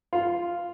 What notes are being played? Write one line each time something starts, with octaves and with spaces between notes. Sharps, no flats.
F4